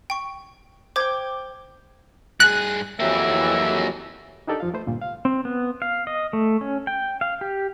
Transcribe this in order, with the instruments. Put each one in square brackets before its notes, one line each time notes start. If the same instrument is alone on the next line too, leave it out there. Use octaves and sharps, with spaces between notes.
[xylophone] G5 C#6
[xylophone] C5 G#6 [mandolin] G5 D6
[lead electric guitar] G2 G#4 [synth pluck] F#6
[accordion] F2 E3 F#3 [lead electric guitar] A#3 G4 [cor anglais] E5
[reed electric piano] D4 D#4 G4 A4 A#4 D5
F2 F3 F4 F5
A3 B4 C5
C#2 G2 A#2 D3
F5
[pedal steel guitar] C4
B3
F5
D#5
A3
C#4
G5
F5
G4